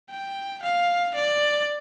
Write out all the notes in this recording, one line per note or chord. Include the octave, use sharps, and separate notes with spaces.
G5
F5
D5